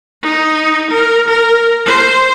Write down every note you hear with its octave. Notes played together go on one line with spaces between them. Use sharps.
D#4
A#4
A#4
C5